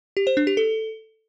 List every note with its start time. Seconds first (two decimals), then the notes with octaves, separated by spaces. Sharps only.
0.17 G4
0.27 C5
0.37 D4
0.47 G4
0.57 A4